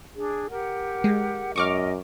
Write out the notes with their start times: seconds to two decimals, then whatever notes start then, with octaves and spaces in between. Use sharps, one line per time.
0.15 D4 G#4
0.49 G4 A#4 F#5
1.04 G#3
1.56 F#2 D#5 C#6 D6 F6